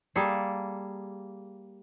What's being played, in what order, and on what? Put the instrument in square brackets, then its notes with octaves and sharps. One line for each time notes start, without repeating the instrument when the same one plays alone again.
[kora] G3 A#3 G#4 A4